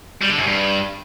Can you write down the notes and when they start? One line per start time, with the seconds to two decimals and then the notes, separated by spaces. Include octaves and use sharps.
0.21 G3
0.30 D3
0.38 F#2
0.47 G2